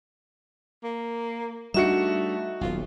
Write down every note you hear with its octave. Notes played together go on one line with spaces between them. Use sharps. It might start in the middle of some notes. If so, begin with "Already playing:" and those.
A#3
G3 A3 D4 D#4 F#4 E5 C#7
D#1 B1 F4